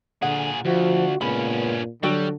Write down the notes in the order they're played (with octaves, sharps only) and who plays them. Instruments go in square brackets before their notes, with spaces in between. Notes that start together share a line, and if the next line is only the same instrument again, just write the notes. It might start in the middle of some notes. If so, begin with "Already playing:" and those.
[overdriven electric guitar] A#2 G#4 [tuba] D3 [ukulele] F#5
[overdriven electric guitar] D2 [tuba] F3 [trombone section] F4 F#4
[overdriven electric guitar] G2 C#4 [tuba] A#2 [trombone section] C#3 G#3 B3 [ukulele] B5
[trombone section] D3 [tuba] F#3 [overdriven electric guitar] G3 [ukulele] F#4 A4 G5